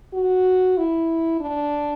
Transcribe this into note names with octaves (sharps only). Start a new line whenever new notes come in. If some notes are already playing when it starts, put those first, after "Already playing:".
F#4
E4
D4